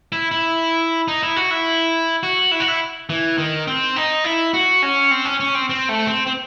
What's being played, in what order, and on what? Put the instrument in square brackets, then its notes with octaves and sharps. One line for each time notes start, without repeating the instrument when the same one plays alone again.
[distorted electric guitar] E4
E4
D#4
E4
F#4
E4
F#4
E4
F#4
E4
E3
D#3
C4
D#4
E4
F#4
C#4
C4
C#4
C#4
C4
C4
A3
C4
C4